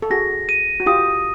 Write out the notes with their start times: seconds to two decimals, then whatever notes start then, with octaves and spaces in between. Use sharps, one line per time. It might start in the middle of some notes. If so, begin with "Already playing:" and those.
0.02 A4
0.10 F#4 G#4 A#6
0.49 D#7
0.80 F#4
0.86 F4 G4 D#6